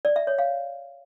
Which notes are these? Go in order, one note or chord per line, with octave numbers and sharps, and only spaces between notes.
D5
E5
C#5
F5